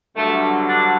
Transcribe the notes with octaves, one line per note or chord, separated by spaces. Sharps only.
G2 D3 F#3 A3
D4